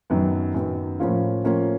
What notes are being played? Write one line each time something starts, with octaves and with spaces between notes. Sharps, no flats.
F#2 D#3 F#3 B3
F#2 D#3 F#3 B3
A2 F3 A#3 C#4 F4
A2 F3 A#3 C#4 F4